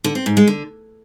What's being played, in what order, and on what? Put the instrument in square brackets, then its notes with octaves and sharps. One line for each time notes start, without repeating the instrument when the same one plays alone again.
[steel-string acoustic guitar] D3
C4
G#2
G#3
D3